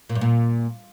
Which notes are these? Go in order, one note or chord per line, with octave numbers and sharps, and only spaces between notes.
A#2
G2
A#2